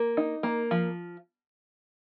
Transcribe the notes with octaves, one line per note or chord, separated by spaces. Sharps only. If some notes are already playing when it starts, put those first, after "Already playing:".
Already playing: A#3
D#4
A#3
F3